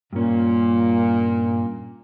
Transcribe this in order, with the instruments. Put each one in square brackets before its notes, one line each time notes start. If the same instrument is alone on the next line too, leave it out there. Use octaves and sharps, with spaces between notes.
[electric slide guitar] G2 C#4 [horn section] A#2